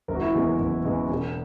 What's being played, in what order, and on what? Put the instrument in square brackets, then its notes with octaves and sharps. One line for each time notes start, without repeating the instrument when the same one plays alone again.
[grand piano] F#1 A#4
F#4
E4
E2 C#3 E3 G#3 F#4
A#4
F#1
E2 C#3 E3 G#3
E1